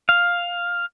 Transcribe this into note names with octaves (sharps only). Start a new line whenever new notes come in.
F5